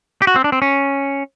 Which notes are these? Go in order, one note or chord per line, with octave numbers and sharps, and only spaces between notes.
G4
F#4
C4
D4
C4
C#4